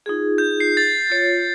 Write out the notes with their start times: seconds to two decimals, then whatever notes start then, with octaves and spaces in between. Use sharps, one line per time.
0.06 D#4 F4 G#4
0.38 G6
0.60 C7
0.77 A6
1.10 F4 C#5